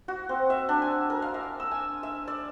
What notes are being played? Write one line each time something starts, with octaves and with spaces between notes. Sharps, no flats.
F#4
C4
E5
D4
G#5
A#4
F5
E5
E6
G#5
E5
D5